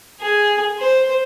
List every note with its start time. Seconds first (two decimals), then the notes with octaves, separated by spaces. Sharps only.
0.21 G#4
0.79 C5